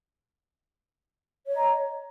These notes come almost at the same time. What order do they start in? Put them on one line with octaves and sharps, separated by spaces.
C#5 D#5 A#5